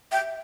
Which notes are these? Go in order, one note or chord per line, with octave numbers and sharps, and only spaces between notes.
E5 G5